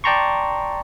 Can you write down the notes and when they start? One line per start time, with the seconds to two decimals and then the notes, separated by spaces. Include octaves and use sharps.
0.04 D5 G5 A5 A#5 C6 C#6